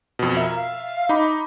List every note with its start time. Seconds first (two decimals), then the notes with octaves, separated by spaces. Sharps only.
0.19 F2 B2
0.37 A#4 E5
0.55 F5
1.09 D#4 B5 D6